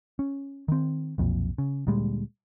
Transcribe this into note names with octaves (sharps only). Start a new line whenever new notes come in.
C#4
D#3 C4
B1 F2 A#2
C#3
D2 A#2 G3 G#3